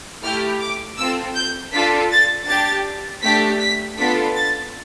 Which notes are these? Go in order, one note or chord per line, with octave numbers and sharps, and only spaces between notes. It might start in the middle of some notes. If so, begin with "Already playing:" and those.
A3 E4 G4 F6
D6
C4 F4 A4 E6
G6
D4 F4 A4 B6
A6
D4 G4 A6
A3 D4 G4 B6
B6
B3 D4 F4 A4 B6
A6